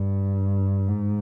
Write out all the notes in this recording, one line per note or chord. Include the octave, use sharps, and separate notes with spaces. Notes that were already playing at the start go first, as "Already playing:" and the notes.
Already playing: G2
G#2